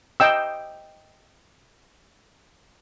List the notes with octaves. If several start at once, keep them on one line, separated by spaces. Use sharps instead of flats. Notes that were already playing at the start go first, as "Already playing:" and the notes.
D#5 G5 E6